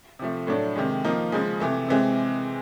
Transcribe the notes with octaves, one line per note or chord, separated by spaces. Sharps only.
C3 F3 A3
A2 F#3 A3 D4
C3 D#3 G#3
F3 A#3 D#4
C#3 F3 G#3
C3 E3 A3
C3 E3 G#3 C4